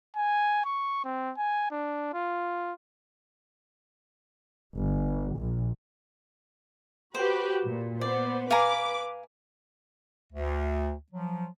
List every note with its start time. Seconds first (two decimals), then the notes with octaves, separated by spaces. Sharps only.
0.16 G#5
0.65 C#6
1.05 C4
1.37 G#5
1.71 D4
2.14 F4
4.76 G1
5.36 A#1
7.15 F#4 G4 B4 C5
7.64 A#2
8.01 B3 C5 D5
8.51 B4 F5 G#5 A#5 D6
10.33 D2
11.11 F3 F#3